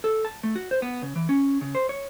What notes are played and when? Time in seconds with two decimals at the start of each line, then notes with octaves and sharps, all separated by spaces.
0.04 A4
0.25 A5
0.43 A3
0.56 F#4
0.71 C5
0.82 B3
1.02 C#3
1.16 E3
1.29 C#4
1.61 C#3
1.75 C5
1.89 C#5